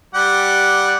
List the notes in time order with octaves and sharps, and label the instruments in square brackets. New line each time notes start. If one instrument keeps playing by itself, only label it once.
[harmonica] G3 G4 F#5